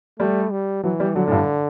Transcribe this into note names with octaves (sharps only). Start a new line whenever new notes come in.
G3 A3
G3
E3 F#3
G3
D3 F#3
A2
G2